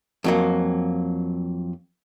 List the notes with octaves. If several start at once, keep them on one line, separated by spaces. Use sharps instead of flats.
F2 F#3 A#3